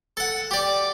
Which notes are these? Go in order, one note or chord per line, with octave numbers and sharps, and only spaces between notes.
A4 F#5
G4 D5